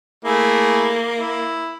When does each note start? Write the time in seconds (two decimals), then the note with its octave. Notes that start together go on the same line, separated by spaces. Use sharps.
0.25 A3 A#3 E4 G#4
1.19 E4